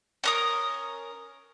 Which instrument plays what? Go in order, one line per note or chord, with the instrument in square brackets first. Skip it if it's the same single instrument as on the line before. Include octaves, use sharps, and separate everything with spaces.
[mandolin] C#4 A#4 D#6